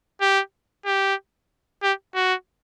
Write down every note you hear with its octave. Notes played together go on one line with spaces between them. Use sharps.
G4
G4
G4
F#4